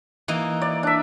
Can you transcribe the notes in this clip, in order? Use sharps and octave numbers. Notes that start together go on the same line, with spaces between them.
E3 A#3 D#4
D5
D4 E5